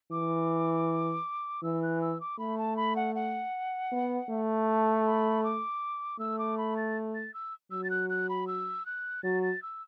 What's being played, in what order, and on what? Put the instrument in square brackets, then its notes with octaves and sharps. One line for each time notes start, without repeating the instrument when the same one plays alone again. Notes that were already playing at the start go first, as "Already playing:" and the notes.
[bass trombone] E3 [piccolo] D6
[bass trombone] E3 [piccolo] E6
[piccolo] F#6
E6
D6
[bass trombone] A3 [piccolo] B5
[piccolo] A5
B5
F#5
F#5
[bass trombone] B3
A3
[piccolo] A5
B5
D6
[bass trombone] A3 [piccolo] E6
[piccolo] D6
B5
A6
A6
E6
[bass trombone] F#3 [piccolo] E6
[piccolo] A6
F#6
F#6
B5
E6
F#6
[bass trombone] F#3 [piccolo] A6
[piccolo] A6
E6